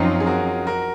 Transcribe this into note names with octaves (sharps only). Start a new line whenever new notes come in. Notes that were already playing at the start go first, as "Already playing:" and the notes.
Already playing: F#2 F3 C4 C#4 D#4 F4
G#4
F#4 A#4
F#4 A#4